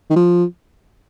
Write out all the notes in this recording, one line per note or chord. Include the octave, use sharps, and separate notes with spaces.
D#3
F3